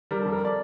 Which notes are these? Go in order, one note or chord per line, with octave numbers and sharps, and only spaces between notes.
G3 A#4
F2 A4
A#4
D5